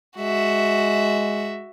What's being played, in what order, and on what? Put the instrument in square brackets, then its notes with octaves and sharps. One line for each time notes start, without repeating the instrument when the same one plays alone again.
[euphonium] G#3 [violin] F#4 E5